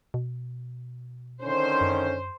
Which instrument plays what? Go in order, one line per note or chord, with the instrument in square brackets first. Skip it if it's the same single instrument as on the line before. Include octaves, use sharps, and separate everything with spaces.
[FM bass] B2
[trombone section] D3 D#3 C#4 [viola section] C5
[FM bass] F#2